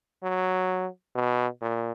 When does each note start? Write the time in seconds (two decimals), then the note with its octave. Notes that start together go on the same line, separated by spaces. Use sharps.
0.23 F#3
1.15 B2
1.62 A#2